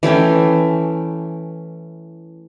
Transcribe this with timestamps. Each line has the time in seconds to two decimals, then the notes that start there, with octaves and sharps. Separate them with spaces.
0.03 E3 A3 C#4 G5